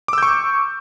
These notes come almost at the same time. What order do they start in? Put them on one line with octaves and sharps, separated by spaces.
D6 E6 G6 C#6